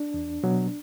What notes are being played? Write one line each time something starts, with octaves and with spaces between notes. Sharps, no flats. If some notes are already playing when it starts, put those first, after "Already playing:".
Already playing: D4
E2
B2 F#3 B3